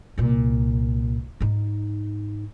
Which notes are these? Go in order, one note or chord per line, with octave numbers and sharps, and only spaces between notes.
C2 A#2
G#2 D#4